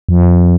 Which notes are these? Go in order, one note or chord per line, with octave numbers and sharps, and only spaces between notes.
F2